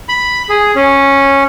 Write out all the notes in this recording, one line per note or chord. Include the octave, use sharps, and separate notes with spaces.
B5
G#4
C#4